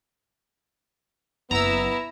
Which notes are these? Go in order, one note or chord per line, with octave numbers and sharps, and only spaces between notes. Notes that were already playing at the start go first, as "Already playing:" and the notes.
F#1 B3 E4 A#5 E6